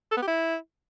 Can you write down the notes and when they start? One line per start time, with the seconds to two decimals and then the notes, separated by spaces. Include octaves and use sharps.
0.12 A4
0.17 B3
0.22 G4
0.28 E4